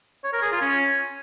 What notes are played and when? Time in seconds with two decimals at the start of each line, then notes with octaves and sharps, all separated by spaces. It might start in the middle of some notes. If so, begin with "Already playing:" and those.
0.24 C#5
0.33 A#4
0.42 G#4
0.51 F4
0.61 C#4